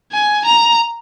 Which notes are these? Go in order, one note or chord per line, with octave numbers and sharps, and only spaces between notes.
G#5
A#5